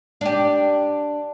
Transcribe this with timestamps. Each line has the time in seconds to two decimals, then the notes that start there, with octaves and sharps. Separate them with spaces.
0.21 D4 G4